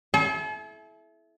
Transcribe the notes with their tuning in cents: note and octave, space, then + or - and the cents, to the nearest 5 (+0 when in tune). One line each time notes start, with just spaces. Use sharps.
E4 +0 A4 -45